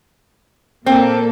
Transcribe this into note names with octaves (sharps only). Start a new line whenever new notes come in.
A#2 A#3 C4 A4